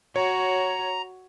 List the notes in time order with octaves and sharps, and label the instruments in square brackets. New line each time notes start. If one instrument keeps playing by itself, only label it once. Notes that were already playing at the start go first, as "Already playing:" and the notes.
[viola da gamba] F#4 [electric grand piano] C#5 [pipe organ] A#5